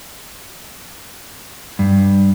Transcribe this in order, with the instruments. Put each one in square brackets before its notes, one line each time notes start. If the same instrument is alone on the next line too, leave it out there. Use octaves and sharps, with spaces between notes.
[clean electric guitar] G2